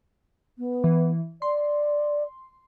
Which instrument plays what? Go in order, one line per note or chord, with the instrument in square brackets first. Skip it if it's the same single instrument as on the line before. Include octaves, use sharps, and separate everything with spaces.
[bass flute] B3
[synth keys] E3
[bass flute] D5 [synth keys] C6